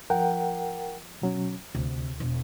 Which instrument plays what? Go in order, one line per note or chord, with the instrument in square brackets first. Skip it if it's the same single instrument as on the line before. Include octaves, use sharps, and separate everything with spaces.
[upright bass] F3 [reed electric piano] A#4 F#5 G5
[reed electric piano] B2 F#3 C#4
[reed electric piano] D2 [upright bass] C3
[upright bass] E1